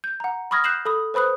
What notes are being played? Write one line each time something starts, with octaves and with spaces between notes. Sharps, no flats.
G6
F#5 A#5
B5 C#6 D#6 F6 G#6 A#6
F#6 G6 C7 E7 F#7
A4 B5 D#6
B4 C5 B5 D#6 F#6